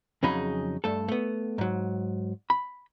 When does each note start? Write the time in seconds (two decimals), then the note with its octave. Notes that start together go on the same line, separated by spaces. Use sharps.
0.23 F2 C#3 F#3 D#4 G#4 B5
0.84 G2 A3 A4
1.08 A3 B3
1.58 G#2 F#3
2.50 B5